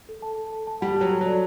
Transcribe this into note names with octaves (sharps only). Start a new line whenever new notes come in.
A4
A5
A4
A5
A5
G3 F#5
F#3 A5
A4
F#3 D5